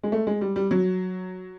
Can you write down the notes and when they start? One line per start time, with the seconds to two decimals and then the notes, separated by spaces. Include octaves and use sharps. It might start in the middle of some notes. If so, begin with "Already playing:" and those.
0.03 G#3
0.12 A3
0.27 G#3
0.41 G3
0.56 G3
0.71 F#3